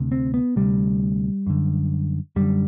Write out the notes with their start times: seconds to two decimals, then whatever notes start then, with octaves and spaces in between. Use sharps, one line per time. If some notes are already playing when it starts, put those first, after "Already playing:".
Already playing: D2 C3
0.12 C4
0.34 B3
0.56 D2 C3 G3
1.47 F#2 D3
2.36 F#2 D3 G3